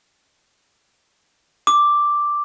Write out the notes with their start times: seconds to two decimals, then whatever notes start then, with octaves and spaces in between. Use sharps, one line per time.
1.67 D6